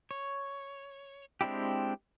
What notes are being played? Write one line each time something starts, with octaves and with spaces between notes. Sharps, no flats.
C#5
G#3 C4 D4 E4 G4